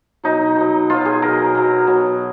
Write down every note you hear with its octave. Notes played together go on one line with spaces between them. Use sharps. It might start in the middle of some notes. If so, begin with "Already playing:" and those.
B2 F#3 D#4
B2 F#3
B2 F#3 F4
G#4
B2 F#3 A#4
B2 F#3
B2 F#3